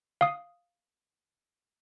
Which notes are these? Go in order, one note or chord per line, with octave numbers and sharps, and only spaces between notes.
F5 D#6